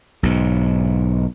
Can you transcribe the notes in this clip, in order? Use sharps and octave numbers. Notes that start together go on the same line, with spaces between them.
B1 G#2